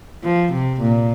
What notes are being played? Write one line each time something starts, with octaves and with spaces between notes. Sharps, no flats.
F3
C3
A#2